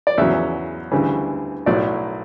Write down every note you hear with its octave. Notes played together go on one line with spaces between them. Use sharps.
D5
E2 C#3 F#3 E5
D2 C#3 E3 G3
B1 A2 F#3 D5